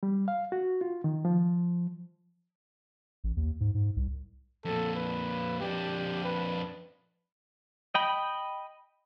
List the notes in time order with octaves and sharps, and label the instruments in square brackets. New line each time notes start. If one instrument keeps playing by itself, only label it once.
[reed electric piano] G3
F5
F#4
F4
D#3
F3
[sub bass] A1
D#2
G#2
G#2
C2
[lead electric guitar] F2 A#2 [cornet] A4
[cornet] B4
[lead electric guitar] F2 D4 [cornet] G4
[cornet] B4
[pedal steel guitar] D#5 G5 B5